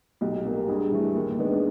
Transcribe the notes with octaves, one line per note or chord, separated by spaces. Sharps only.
B1 G4
B2 G3 A#3
G4
G2 G#4
E3 A3
D#2
D#3 G#3 B3 D4